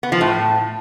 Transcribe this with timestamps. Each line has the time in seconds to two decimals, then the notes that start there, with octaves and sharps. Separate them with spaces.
0.03 B3
0.12 F3
0.21 A2